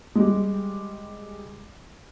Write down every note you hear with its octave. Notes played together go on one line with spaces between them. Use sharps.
G3 G#3